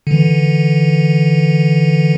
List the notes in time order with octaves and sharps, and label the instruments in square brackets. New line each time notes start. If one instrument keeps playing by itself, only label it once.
[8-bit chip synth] D3 E3